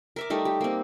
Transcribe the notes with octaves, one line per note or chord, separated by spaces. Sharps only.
A#4 E5 D6
G3 A3 D#4
G4
A#3 C4